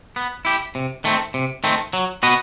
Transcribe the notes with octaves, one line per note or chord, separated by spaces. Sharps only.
B3
E4 G4
C3
D#3 A3 C4
C3
D#3 A3 C4
F#3
B3 F#4 B4 D#5